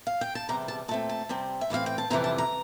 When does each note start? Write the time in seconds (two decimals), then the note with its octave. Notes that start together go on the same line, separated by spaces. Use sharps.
0.07 F5
0.21 G5
0.35 A5
0.49 E2 C3 G3 A#5
0.68 A5
0.88 A#2 A5
0.91 A3 C4
1.09 A5
1.29 C3 G3 C4
1.61 E5
1.70 A2 E3 A3 C4 F5
1.86 G5
1.98 A5
2.10 F2 C3 E3 G3 A#5
2.24 A5
2.38 A#5